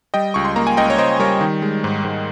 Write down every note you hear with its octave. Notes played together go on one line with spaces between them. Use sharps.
G3 D#5 G5
C#2 C#6
C6
A#3 A#5
G#5
C#2 D#5 G5
C#5
C#2 C5 D#5
G3 A#4 C#5
D#3
G#3
G#2
G#2